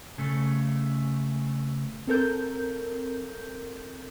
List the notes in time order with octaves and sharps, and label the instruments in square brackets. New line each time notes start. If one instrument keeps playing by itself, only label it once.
[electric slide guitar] C#3 A3
[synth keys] C4 A4 A#4 G6